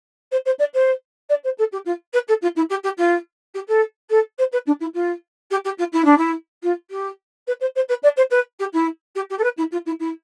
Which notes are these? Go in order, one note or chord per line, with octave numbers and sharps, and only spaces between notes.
C5
C5
D5
C5
D5
C5
A4
G4
F4
B4
A4
F4
E4
G4
G4
F4
G4
A4
A4
C5
B4
D4
E4
F4
G4
G4
F4
E4
D4
E4
F4
G4
B4
C5
C5
B4
D5
C5
B4
G4
E4
G4
G4
A4
B4
E4
F4
E4
E4